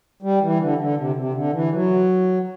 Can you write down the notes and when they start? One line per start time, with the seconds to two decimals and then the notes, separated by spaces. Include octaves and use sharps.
0.22 G3
0.41 E3
0.60 D3
0.78 D3
0.97 C3
1.15 C3
1.34 D3
1.53 E3
1.72 F#3